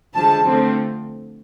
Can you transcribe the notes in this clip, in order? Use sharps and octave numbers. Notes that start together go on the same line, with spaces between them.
D3 F3 G#3 A5
D3 F3 A3 C4